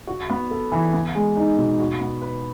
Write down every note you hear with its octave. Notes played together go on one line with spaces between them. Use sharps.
F#4
B3
A4
E3
B3
G#3
D#4
B2
F#4
B3
B4